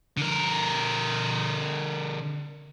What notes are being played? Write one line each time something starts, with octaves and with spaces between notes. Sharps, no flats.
D3 A#4